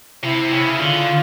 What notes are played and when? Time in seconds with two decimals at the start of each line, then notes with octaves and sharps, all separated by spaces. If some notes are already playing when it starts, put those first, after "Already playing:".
0.23 C3 E4
0.52 C#3
0.78 D3 F4